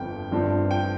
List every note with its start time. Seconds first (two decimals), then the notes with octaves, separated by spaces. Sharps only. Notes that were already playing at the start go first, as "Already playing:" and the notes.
Already playing: G1 F2 F3 G5
0.32 G1 G2 F3 C4
0.71 G5